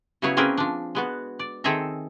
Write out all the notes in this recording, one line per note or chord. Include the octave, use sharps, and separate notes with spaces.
C#3 F#3 B3 E4 G#4 C#5
A#3 C4 C#4 G#4 A#4 B4
F3 D4
G#3 B3 F#4
D5
D#3 C4 G#4 A4 E5 A#5